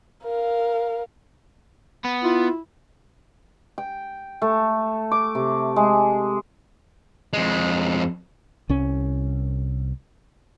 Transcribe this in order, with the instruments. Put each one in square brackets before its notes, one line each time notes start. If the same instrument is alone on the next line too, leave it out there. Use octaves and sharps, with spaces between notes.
[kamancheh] A#4 F5
[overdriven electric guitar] B3
[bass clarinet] E4 [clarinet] F4
[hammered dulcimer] G5
A3
D6
C3
G#3
[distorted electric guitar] F2 G#3
[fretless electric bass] C2 C#4